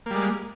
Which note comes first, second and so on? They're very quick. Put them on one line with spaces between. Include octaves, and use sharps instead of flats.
A#3 G3 G#3